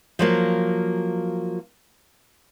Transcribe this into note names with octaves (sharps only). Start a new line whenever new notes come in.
F3 F#3 A#3